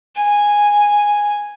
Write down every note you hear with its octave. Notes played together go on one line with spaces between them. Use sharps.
G#5